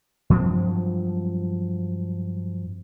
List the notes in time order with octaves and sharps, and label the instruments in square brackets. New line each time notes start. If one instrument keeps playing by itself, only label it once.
[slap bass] G2 F3 F#3 C4